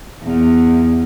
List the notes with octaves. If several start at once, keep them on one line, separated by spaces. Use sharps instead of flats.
E2